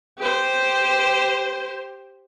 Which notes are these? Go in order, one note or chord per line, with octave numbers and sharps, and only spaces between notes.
G4 C5